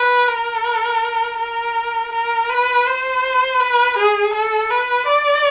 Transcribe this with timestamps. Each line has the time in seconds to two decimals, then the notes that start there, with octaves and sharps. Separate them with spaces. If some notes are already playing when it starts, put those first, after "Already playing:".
Already playing: B4
0.28 A#4
1.38 A#4
2.13 A#4
2.49 B4
2.87 C5
3.60 B4
3.98 G#4
4.34 A4
4.71 B4
5.07 D5